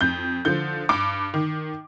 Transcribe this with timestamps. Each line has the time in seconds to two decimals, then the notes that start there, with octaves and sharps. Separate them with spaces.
0.01 F2 G6
0.45 D3 F3 G6
0.89 G2 D6
1.34 D#3